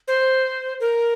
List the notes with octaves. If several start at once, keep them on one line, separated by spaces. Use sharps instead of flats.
C5
A#4